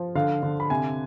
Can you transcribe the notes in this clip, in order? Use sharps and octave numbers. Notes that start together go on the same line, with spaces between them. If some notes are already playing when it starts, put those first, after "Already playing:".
Already playing: F3
D3 F5
D3
B5
C3 G#5